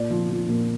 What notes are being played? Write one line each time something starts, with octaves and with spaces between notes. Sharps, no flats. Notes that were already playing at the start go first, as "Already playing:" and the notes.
Already playing: A#2 D5
F3
F3
A#2